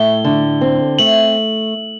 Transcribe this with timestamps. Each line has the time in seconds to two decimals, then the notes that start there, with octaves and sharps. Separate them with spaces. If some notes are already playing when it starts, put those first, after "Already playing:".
Already playing: A2 A3 G7
0.24 D3
0.61 C4
0.99 A3 F#7